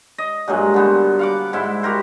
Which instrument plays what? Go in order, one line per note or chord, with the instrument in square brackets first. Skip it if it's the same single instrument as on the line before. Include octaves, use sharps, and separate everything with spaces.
[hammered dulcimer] D#5
G2 A#2 F#3 G#3
D3 B3 C5
F5 F#5 D6
G#2 E4 E5 C6
F#4 G4 A#4 C5